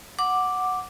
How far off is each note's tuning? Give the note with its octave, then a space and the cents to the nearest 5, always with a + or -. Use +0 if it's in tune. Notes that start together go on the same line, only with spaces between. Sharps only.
F#5 -5 D6 +0